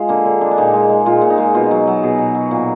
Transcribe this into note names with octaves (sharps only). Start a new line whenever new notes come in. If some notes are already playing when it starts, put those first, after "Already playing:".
Already playing: G#3 F4
D3 A#3
D3
G#3 D4
D4
A#2 D#4
G#3
G#3
A#2 F4
A#2
D#4
G#3
B2 F4
F#3
F#3
B2 G#4
B2
F#3
A#2